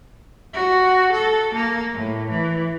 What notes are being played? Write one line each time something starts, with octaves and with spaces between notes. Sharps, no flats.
F#4
A4
A#3
A2
E3